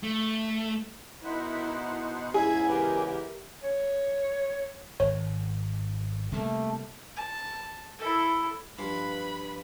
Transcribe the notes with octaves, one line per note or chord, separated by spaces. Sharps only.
A3
B2 D#4 E4 A#4 C5 F#5
E2 G#2 C#3 E4 G#4 G#6
E3 G4 A#4 E5
C#5
G#1 C#5
C3 G3 A3 A#3
A5
E4 A4
G2 F3 F4 B4 B5